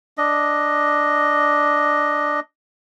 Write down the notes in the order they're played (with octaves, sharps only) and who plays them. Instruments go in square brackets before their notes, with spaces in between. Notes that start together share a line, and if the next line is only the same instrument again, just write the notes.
[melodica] D4 D#5